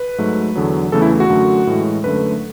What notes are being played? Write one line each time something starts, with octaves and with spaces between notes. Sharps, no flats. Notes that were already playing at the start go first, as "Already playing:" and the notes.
Already playing: B4
G#2 F#3 A3
E2 D3 F#3
E2 C#3 E3 A3 A4
E4
F#4
F#2 D3 A3
A2 E3 G#3
F#2 D3 A3 B4